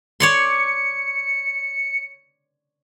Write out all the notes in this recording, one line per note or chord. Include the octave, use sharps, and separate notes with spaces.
C#5 D5 C6 C#7